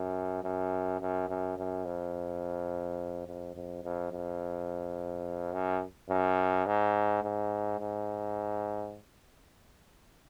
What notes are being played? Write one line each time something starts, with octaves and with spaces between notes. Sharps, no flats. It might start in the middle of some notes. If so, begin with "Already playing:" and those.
Already playing: F#2
F#2
F#2
F#2
F#2
F2
F2
F2
F2
F2
F#2
F#2
G#2
G#2
G#2